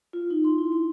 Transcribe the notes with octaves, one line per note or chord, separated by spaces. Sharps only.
F4
D#4
C6
E4
C6